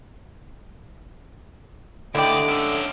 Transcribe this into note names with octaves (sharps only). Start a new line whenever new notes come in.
D2 D3 E4 G4 D5 D#5 D6
C#4 E5